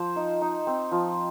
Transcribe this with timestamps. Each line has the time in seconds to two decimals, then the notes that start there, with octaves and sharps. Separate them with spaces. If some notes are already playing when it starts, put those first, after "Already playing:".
Already playing: F3 C5
0.16 D#4
0.41 D#4
0.67 C4
0.92 F3